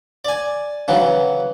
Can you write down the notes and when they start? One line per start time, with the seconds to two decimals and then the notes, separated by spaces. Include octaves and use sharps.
0.25 D5 G#5
0.88 C#3 E3 F#3